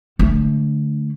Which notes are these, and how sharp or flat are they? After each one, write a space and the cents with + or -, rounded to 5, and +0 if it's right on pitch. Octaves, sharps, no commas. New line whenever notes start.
D3 +0 A3 +0